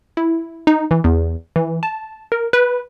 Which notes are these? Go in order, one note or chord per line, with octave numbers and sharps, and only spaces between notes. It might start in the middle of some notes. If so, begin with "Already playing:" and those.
E4
D#4
E3
E2
E3
A5
A#4
B4